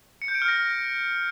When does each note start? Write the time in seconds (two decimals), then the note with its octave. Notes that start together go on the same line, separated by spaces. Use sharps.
0.22 C#7
0.28 G6
0.35 D7
0.42 F6
0.48 A#6